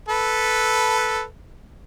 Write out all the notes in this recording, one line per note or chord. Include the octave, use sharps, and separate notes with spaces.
A4 B4